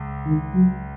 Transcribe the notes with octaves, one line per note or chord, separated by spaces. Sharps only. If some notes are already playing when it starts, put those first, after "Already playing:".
Already playing: C#2
D#3
F#3